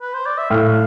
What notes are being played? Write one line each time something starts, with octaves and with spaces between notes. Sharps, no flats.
B4
C5
D5
E5
A2 F5